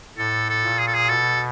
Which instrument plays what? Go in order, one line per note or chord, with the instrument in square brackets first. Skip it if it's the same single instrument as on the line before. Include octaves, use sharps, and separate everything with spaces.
[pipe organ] A2 [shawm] A4
[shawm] A4
[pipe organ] A#2
[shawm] G#4
A4
G#4
[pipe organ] B2 [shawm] A4